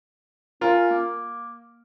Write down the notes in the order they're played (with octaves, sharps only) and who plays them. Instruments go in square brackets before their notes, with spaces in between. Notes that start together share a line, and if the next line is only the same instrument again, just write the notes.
[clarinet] C#4 [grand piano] F4 A#4
[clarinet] A#3